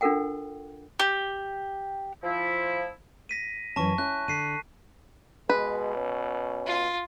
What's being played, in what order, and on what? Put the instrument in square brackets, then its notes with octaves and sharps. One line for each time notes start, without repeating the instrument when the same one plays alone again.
[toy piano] D4 F4 A4 A#4 F#5 G5
[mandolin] G4
[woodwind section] F3 E4
[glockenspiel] A#6 B6 D#7
[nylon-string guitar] F#2 E3 C#4 [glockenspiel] A5 C#6
[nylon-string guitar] C#4 E4 [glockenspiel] F#6
[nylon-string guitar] D3 [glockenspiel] B6 C7 D#7
[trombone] B2 [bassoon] G#3 [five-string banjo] B4
[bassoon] C#4
[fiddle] F4